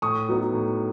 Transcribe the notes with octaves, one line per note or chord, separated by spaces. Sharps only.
A2 C#6 D#6
F#3 B3 D#4
A2